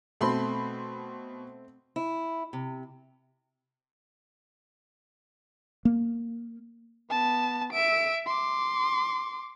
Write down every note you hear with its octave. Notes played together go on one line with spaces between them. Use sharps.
B2 A3 C4 B5 C6
E4
C3
A#3
B3 A5
E5 D7
C6 D6